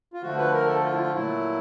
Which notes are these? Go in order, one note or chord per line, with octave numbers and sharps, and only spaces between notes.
F4
D3 F3 A3 F#4
B4
A#4
A4
F4
E4
F4
A#2 F#3 A3 E4